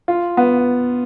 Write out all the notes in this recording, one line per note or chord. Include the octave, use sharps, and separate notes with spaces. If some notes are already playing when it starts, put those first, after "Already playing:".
F4
B3